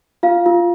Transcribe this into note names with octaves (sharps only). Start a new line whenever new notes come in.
F4 F5
F4